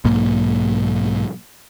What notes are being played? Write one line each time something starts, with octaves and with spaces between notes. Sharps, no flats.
B1 G#2 A#3